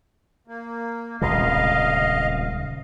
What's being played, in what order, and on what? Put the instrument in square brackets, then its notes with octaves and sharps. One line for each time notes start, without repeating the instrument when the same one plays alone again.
[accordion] A#3
[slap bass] D#1 C#2 C3 [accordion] D#5 F5